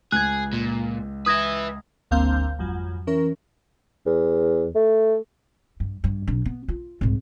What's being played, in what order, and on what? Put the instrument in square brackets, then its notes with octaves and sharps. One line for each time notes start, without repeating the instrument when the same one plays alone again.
[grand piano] C#2 [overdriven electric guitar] G#4 [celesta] F#6 G#6
[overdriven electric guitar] A#2
[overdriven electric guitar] B4 E5 [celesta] D#6 G#6 A#6
[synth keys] G1 D2 A#3 C4 F5 G6
G#1 F2 F#3
E3 C#4 A#4
[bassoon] E2
A3
[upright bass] G2
G2
B1 D4
B3
F4
C2 G#2